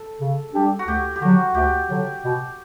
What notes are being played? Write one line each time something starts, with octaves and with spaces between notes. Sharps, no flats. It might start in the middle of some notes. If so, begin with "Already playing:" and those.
Already playing: A4
C#3
G3 D4 G4
F#4
D2 G4
G4
D3 F#3 F#4
D2 G4
D3 F#3
B2